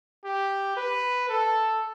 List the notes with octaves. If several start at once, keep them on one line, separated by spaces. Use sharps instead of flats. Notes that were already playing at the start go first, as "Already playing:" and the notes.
G4
B4
A4